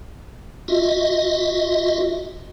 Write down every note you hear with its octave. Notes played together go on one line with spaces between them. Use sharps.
F4 F#4 D#5 E5